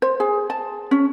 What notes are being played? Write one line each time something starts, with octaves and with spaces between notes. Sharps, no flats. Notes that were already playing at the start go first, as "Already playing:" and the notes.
C5
G#4
A5
C#4